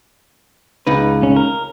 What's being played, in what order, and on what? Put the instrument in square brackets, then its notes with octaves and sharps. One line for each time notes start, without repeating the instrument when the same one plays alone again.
[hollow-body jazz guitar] C#2 D#4 B4
[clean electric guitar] C#4
A#4